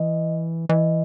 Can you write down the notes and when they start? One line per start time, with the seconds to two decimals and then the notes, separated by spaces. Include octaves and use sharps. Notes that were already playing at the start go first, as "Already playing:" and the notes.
Already playing: E3 D#5
0.69 E3 D#5